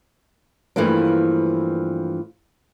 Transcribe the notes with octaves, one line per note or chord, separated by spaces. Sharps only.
G2 E3 F3 A3 A#3 D4